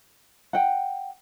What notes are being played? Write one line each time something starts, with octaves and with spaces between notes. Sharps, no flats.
F#5 G5